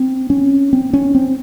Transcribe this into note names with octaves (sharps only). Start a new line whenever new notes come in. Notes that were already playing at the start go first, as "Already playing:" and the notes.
Already playing: C4
C#4
C4
C#4
C4